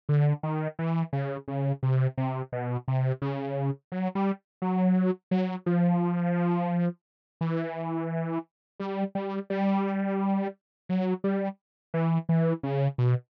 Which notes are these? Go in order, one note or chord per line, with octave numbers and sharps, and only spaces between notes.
D3
D#3
E3
C#3
C#3
C3
C3
B2
C3
C#3
F#3
G3
F#3
F#3
F3
E3
G3
G3
G3
F#3
G3
E3
E3
C#3
B2